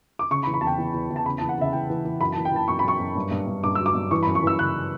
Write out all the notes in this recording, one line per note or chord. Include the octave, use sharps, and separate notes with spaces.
D6
C#3 C#6
B5
E3
B5
E2 A5
G5
E2
E2
E2
A5
C#3 B5
E3 A5
F#5
C#3 E5
E3 G5
E3
E3
F#2 B5
E3 A5
G5
E3 A5
F#2 C#6
B5
F#2 C#6
F#2
G2
G2
G2
G2 D6
F#3 E6
D6
G2
E3 C#6
F#2 B5
C#6
E3 E6
C#3 F#6